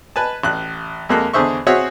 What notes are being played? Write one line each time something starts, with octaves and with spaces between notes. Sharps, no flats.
B4 G#5 A5
A1 F#6
F2 G#3 A#3 A4 F#6
E2 D3 G#4 C5 E5 C#6
C4 F#4 G#4 C#5 E5 F#5